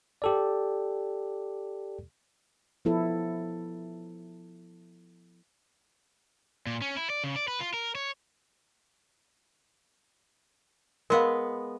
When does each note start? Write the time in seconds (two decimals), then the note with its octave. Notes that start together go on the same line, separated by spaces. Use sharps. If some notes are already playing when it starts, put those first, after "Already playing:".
0.22 G4 A4 D5
2.85 F3 B3 E4 A4
6.67 A#2
6.82 C#4
6.97 E4
7.10 D5
7.24 C#3
7.36 D5
7.48 B4
7.60 F4
7.74 A#4
7.95 C#5
11.10 G#3 B3 A#4 F5